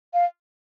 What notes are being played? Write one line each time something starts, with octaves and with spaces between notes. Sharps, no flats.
F5